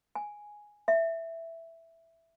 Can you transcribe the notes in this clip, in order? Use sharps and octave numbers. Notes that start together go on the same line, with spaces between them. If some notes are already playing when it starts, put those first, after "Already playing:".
G#5
E5